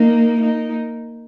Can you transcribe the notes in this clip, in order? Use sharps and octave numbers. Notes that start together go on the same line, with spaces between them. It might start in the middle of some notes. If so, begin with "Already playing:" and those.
Already playing: A#3 D#4
A#3 D#4